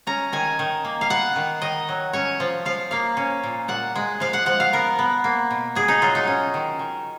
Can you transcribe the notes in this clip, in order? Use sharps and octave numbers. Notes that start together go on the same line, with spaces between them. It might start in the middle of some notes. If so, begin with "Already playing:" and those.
C#4 A#5
D#3 G#5
D#3
A#3
F5
B3 F#5
D#3
D#3 D#5
F#3
C#4 C#5
F3
F3 F5
A#3 F5
C#4
A#2
A#2 F#5
G#3
F3 F5
F#5
F3 F#5
F5
B3 A#4
B3
A#3
B2
B2 G#4
D#4
F#3 F4
D#4
C#4
D#3
D#3